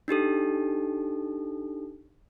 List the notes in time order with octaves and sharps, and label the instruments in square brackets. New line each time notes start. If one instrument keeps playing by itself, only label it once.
[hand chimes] D4 D#4 G4 A4